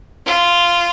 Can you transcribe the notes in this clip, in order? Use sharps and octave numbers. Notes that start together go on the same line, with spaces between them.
F4